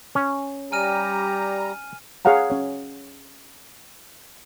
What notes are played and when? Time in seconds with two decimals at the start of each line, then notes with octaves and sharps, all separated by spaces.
0.15 C#4
0.72 G3 G4 G#5 A#5 F6 D#7
2.25 G#4 C#5 F5 F#5 A#5
2.50 C#4 C#5